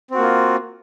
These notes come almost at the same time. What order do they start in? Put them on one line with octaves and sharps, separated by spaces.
C4 F#4 A#3 F4